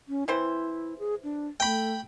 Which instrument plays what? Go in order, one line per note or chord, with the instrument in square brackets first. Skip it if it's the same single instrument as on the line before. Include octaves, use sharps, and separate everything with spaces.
[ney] C#4
[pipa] E3 C4 C5 [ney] E4
[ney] G#4
D4
[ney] A3 [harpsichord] G5 B5